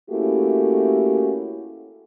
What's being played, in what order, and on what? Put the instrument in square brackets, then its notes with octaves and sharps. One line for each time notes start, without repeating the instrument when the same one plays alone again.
[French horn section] A3 A#3 C#4 E4 F#4 G4